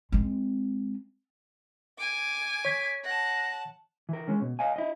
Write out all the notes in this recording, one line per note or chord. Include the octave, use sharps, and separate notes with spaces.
G#3 C4
G#5 D6
C#5 G#6 B6
F#5 A5 A#6
E3 A#4
G#3 C#4
B2
D#5 F5 G#5
E4 D#5